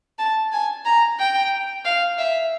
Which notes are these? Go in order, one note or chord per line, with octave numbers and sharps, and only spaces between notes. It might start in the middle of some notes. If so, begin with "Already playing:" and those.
A5
G#5
A#5
G5
F5
E5